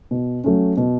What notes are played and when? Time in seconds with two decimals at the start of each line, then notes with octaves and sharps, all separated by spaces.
0.11 B2
0.44 F#3 A3 C#4
0.77 B2